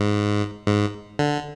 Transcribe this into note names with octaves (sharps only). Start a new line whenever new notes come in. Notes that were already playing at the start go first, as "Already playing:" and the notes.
Already playing: G#2
G#2
D3